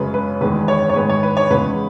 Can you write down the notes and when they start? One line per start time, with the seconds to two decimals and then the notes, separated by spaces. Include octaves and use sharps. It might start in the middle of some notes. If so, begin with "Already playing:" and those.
Already playing: F#2 C#3 G#3 B4
0.14 B4
0.41 E2 D#3 G#3 B4
0.68 C#5
0.89 C#5
0.96 G#2 D#3 G#3 B4
1.10 C#5
1.23 B4
1.37 C#5
1.50 E2 C#3 G#3 B4